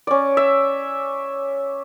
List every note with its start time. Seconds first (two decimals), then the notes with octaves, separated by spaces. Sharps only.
0.07 C#4 D5
0.37 E5